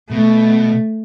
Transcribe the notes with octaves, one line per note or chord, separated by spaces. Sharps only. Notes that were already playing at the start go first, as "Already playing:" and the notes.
B2 A3